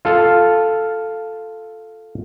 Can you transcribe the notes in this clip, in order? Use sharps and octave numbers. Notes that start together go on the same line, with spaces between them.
F4 A4 F5